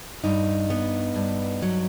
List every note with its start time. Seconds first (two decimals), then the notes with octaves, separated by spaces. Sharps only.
0.24 G2 D#4
0.70 B3
1.16 G2
1.62 F#3